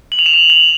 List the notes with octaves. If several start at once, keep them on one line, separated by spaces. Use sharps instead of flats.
F#7
F7
E7
F7
F#7